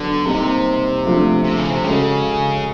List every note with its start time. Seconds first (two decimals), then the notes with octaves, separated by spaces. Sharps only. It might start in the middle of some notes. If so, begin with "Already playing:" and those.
Already playing: D3 F#3 B3 D4 F#4
0.26 C3 G3 A#3 D#4
1.05 F3 A3 D4 F4
1.44 C3
1.57 C#3
1.71 C3
1.84 C#3 G#3 C#4 F#4 A4